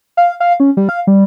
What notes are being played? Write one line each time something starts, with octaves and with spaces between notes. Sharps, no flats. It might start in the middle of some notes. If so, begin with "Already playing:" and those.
F5
F5
C#4
G3
F5
G3